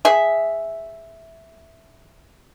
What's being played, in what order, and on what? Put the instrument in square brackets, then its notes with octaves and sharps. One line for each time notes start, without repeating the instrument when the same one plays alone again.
[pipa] G#4 E5